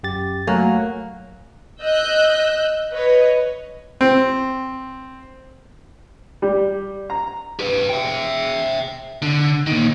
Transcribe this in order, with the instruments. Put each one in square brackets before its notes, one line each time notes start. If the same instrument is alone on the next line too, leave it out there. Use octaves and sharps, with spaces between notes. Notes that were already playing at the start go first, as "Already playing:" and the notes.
[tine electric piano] F#2 G4 A6
[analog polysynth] F#3 [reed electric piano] A3 [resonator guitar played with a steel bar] A#3 [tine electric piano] G#5 F#6
[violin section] D#5 E6 F#6 G6
B4 C#5 D#5
[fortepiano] C4
G3
A#5
[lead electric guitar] G4 B4
E5 G5
D3
A#2 D#3